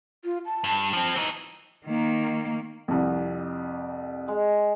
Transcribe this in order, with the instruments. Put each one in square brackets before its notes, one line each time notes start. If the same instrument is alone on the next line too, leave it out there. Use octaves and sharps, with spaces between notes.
[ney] F4
A5
[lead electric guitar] G2
F3 C4
E3 D#4
[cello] D#3 A#3
[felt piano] C2 F2
[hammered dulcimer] G#3